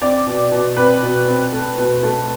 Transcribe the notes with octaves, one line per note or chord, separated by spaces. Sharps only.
C4 D5
B2
B2
C4 B4
B2
C4
A3
B2
A3